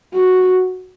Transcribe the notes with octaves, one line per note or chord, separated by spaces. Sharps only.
F#4